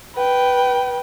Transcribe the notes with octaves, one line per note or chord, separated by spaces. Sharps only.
B4 G5